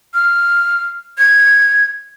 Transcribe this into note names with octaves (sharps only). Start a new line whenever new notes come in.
F6
G#6